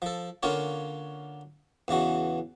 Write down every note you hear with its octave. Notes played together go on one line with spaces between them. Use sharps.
F3 A4
D3 A#3 C#4 F4 C#5
E2 C#3 E3 F#4